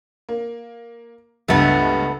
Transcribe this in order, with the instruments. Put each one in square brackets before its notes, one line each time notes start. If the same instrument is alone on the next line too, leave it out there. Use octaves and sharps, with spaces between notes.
[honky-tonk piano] A#3
[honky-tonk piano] C#2 G2 [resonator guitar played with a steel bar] A3 B3